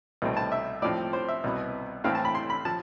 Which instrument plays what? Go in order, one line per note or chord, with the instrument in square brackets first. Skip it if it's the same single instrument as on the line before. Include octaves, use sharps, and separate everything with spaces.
[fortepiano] C2 B2 A3 C4
A5
E5
A2 F3 C4 D5
C5
E5
C2 B2 B3
A2 E3 A3 C4 F5
A5
B5
C6
B5
F3 A5